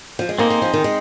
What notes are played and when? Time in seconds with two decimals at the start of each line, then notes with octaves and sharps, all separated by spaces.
0.19 F3
0.29 G#3
0.38 A#3 C4 D#4 G#4 C5
0.50 A#3
0.62 F3
0.74 D#3
0.84 G#3